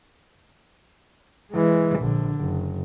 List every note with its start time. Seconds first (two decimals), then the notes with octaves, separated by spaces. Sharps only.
1.51 E3 G#3
2.00 A#1 D3
2.41 F#1